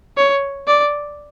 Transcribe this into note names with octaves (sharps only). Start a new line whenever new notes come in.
C#5
D5